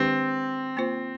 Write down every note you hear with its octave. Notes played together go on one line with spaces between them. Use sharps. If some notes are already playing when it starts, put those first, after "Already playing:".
Already playing: D#3 G#3 C4 D4 G4 C5
A#3 F4 C5